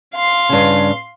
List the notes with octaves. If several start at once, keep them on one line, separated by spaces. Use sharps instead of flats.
F5 C6
G2 C#3